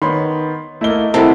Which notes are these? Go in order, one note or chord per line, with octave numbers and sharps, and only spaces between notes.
D#3 B3 C#5 B5 C6
A3 A#3 E4 D#5 G7
C3 E4 G4 A4 A#4 F#5